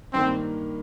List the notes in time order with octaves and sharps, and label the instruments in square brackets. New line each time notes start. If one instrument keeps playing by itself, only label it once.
[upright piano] G2 D#3 A#3 [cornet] C4